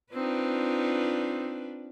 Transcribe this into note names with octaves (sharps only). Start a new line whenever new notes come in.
C4 D4 D#4 F4 B4